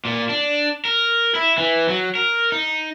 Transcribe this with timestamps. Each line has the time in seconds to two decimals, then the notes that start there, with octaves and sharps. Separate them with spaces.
0.05 A#2
0.29 D4
0.85 A#4
1.35 E4
1.58 E3
1.89 F#3
2.15 A#4
2.52 D#4